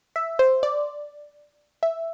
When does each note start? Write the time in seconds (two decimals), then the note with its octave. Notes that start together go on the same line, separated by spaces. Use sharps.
0.16 E5
0.39 C5
0.63 D5
1.83 E5